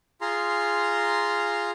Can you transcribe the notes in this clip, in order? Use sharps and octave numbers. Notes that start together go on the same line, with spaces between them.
F4 G#4 A#5 C6